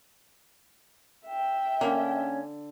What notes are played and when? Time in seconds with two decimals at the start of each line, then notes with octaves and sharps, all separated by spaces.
1.26 E5 G5
1.81 D3 A#3 C#4